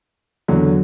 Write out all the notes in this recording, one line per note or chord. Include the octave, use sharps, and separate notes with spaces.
E2 D3 F#3